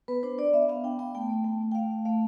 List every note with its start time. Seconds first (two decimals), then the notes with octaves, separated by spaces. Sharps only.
0.08 B3 B4
0.23 D4 C5
0.38 D4 D5
0.53 B3 E5
0.68 B3 F5
0.84 D4 G5
0.99 B3 G5
1.15 A3 G5
1.30 A3
1.44 A3
1.60 A3
1.71 G5
1.75 A3 F5
1.91 A3
2.05 A3 F5